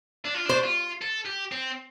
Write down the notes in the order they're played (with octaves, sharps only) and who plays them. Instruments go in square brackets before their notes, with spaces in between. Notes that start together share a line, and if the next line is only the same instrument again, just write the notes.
[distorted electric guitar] D4
F4
[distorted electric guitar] D4 [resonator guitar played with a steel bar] C5
[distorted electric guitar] F4
A4
G4
C4